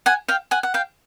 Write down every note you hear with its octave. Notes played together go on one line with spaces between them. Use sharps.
F#5 G#5
F5 G5
F#5 G#5
F#5
F5 G5